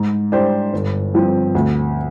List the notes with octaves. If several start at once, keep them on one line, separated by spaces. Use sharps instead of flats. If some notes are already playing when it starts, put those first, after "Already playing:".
Already playing: G#2
G3 D4 G4 C5
G1
G2 F3 C4
D2